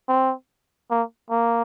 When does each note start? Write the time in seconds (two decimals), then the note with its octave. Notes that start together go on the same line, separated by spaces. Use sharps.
0.09 C4
0.90 A#3
1.30 A#3